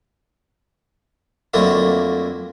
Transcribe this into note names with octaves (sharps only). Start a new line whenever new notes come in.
F2 D3 F#3 A3 A#3 E4